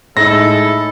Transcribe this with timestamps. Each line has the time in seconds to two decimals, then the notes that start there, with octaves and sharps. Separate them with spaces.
0.17 A2 G#3 D#4 E4 A4 A#6